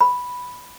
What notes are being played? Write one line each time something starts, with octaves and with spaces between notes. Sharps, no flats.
B5